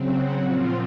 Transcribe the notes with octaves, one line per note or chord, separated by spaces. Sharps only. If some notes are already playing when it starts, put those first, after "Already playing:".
Already playing: C#3 F#3 C4
F#4
A#2 F3 C4 F4